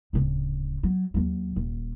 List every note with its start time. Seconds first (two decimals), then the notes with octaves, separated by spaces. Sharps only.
0.13 D1 C#3
0.83 F#3
1.14 D#2 F#3
1.56 D#1